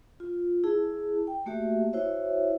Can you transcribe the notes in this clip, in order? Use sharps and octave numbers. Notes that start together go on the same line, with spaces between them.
F4
E4 G#4 A5
G5
A3 A#3 F#4 G4 E5
E4 F#4 C5 C#5 E5